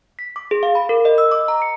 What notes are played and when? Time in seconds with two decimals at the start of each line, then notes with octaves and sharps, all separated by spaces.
0.19 B6
0.36 D6
0.51 G#4
0.63 F5
0.75 B5
0.89 A#4
1.05 D#5
1.18 E6
1.32 D6
1.48 A#5
1.62 C#7